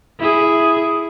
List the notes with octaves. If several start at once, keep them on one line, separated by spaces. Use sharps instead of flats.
E4 G#4